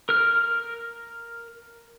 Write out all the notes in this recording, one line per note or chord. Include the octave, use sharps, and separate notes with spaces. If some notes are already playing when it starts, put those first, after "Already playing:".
A#4 F6